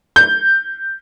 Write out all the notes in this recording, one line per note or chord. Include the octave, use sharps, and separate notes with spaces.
G6